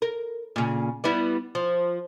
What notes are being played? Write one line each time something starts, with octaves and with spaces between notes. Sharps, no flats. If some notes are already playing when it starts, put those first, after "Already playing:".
A#4
A#2 C#3
G3 B3 E4
F3